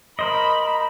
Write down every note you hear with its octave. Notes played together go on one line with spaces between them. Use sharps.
A#4 C5 D#5 B5